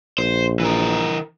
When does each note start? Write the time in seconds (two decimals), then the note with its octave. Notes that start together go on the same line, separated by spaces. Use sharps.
0.18 A#1 C5
0.60 E3 A#4